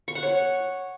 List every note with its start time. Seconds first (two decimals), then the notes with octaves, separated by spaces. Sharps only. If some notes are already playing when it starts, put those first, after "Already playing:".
0.08 C#6
0.15 F#5
0.23 C#5